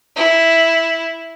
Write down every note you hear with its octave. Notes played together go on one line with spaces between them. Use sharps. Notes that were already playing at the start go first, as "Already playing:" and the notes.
E4